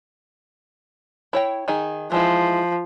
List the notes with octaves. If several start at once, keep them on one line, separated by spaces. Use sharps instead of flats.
E4 C#5 G5
D#3 D#4 G#4
E3 F3 G#3 E4